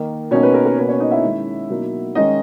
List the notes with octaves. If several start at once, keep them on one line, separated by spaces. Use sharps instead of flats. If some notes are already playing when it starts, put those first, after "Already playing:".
Already playing: D#3 A#3 D#4
B2 A#3 C#4 D#4 C#5
B4
A#4
A#4
B2 A#3 C#4 B4
C#4 C#5
D#4 D#5
E4 E5
D#3 G#3 C#4
B2 F#3 A#3 D#4
D#3 G#3 C#4 D#4 D#5